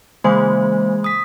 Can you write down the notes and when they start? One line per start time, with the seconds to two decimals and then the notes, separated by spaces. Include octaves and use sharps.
0.24 C#3 E3 G#3 A#3 C5 G#6
1.04 D#6 B6